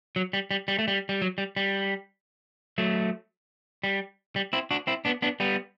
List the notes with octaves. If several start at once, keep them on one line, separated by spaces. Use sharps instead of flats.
F#3
G3
G3
G3
A3
G3
G3
F#3
G3
G3
F#3 A3
G3
G3
C4 E4
D4 F#4
C4 E4
B3 D4
B3 D4
G3 B3